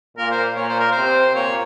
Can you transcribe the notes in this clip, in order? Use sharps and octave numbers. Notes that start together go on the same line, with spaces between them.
A#2 A#3 A#4
C5
A#2 A#3 C#5
C5
A#4
C3 C4 C5
A#2 A#3 C#5